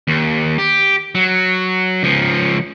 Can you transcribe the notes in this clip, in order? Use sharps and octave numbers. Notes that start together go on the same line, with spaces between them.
D#2
G4
F#3
C#2 F3